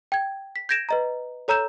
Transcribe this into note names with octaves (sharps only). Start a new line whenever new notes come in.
G5 G#6
B6
G6 G#6 A#6 D7 E7
B4 D#5 A#5
A4 C#5 A#5 E6 G6 E7